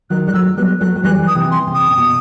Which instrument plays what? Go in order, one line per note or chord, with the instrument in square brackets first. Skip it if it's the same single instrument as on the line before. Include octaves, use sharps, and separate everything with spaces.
[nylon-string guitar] D#3 F#3 [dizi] F#6
[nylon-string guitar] G3 [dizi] F#6
[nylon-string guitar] F#3 A3 [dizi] E6
[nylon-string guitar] G3 B3 [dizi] F#6
[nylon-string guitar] F#3 A3 [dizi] F#6
[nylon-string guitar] F#3
[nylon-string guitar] E3 G3 [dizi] F#6
[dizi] D#6
[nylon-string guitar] C3 E3
[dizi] C6
[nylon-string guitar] C3
[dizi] D#6
[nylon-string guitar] C3
B2